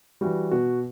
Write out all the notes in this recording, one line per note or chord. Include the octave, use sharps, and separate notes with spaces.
E3 G3 F#4
B2 F#4